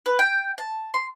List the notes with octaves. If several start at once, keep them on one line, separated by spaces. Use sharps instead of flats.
B4
G5
A5
C6